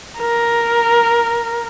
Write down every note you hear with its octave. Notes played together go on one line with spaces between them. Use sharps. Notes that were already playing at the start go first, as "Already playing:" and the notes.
A#4